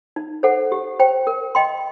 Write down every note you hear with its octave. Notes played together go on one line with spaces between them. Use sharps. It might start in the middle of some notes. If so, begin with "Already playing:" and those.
D#4
A4 C5 F#5
G4
C5 G5
A#4
D#5 G5 C6